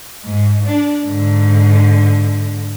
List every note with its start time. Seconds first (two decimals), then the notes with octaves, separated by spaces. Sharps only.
0.24 G#2
0.66 D4
1.06 G#2 D3